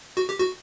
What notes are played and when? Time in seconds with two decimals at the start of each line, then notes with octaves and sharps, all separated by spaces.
0.17 F#4
0.29 G4
0.40 F#4